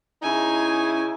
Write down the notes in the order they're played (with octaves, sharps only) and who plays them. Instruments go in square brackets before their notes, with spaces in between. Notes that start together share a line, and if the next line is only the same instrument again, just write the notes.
[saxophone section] C#3 D#4 E4 [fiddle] G#5